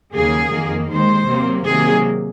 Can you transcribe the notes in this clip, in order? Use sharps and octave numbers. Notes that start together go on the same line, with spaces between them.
D#2 C#3 F#3 A#3 G#4
F2 D#3 A#3
D#2 D#3 G#3 C5
C3 F#3 A#3
C3 D#3 F#3 A#3 G#4